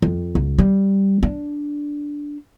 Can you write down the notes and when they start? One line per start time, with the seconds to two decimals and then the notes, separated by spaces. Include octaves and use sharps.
0.02 F2
0.35 C#2
0.58 G3
1.23 D4